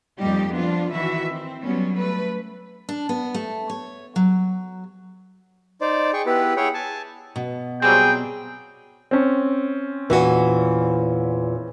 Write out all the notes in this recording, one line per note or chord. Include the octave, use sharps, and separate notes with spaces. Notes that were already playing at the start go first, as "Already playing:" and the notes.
F2 A#2 G3 D#4 G4
F3 B3 D4 F4
D#3 E3 F#4 B4 E5
C4
F#3 G3 B3 C#4
A3 B4
D4
B3
A3
C#5
F#3
D#4 C5 D5
G#4 G5 C#6
B3 E4 G4 B4
E4 G#4 C#5 F#5 G5
G#5 A5
B2
F#3 G3 C4 G#4 G5
C4 C#4
E2 A#2 E3 F#4